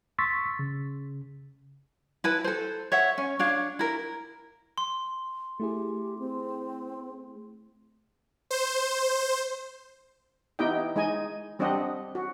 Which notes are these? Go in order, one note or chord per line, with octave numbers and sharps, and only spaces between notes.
C6 C#6 E6 A6 B6
C#3
E4 B4 A5
A4 C5
C#5 E5 F#5
C#4
D4 C#5 F5
E4 A#4
C6
A3 E4 G4 G#4
C4
C5
B3 D#4 E4 G4 D#5 G5
G#3 D#4 D#5 G#5
G3 C4 D4 G4 D#5 F#5
F#4